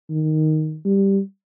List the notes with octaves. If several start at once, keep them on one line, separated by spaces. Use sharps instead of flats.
D#3
G3